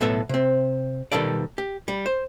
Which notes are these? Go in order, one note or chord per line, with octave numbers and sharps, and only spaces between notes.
B1 A2 B3 A4 E5
C3 C4
B2 D#3 G3 A4 D5
G4
G3
C5